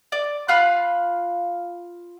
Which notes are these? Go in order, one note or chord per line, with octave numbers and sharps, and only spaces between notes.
D5
F4 F5 B5 F#6